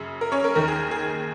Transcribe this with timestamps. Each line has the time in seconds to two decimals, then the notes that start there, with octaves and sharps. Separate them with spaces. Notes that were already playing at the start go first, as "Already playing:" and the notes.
Already playing: F#2 C#3
0.21 A#4
0.32 C#4 C#5
0.44 A#4
0.55 D#2 D#3 A#4
0.68 G#4
0.91 G#4